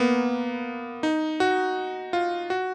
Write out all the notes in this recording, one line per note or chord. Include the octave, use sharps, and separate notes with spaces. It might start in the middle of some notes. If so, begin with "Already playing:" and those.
Already playing: A#3 B3
D#4
F#4
F4
F#4